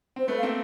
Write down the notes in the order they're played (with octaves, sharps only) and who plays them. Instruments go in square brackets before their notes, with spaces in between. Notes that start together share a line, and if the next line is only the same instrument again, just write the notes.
[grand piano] C4 [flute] C5
[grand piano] A3 B3 [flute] B4
[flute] F5
[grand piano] A#3 C4